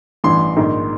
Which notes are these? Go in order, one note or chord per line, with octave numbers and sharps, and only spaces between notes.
A1 G2 E3 C6
A#1 G#2 D#3